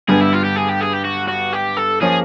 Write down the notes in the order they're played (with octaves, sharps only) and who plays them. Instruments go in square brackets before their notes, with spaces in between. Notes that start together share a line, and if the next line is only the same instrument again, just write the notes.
[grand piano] G2 D3 G3 B3 [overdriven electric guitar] G#4
[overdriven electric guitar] E4
F4
G4
G#4
G4
G#4
G4
F#4
F#4
G4
A4
[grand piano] F3 A#3 C#4 [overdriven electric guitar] G#4